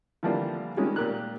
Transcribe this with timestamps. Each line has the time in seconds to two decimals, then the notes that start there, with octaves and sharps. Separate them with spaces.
0.23 D3 E3 F3 G3 A#3 D4
0.77 D#3 G3 G#3 C#4
0.96 A#2 G4 A#4 F#6